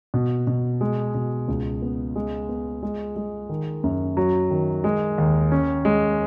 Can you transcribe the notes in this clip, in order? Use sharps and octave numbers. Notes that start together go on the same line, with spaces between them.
B2
B2
G#3
B2
C#2
B3
G#3
B3
G#3
G#3
D#3
F#2
F#3
D#3
G#3
D#2
C#4
G#3